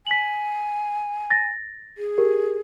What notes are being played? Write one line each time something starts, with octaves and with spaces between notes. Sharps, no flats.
G#5 B6 F#7
A6 A#6
G#4
G4 A#4